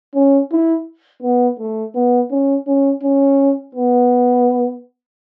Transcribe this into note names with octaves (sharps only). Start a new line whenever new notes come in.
C#4
E4
B3
A3
B3
C#4
C#4
C#4
B3